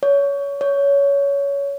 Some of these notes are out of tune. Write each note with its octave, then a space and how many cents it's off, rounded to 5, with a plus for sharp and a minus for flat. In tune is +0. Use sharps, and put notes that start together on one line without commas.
C#5 +25
C#5 +20